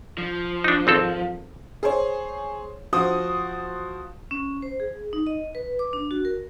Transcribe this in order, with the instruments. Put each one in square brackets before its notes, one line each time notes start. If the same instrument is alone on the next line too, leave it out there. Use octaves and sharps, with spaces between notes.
[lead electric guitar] F3
[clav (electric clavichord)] D4 D#4
G#1 C4 A4
[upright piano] G#4 C5 C#5
F3 F#4 C5 D#6
[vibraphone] C#4
C5
G#4
D#4
D#5
B4
D6
D4
F#4
A#4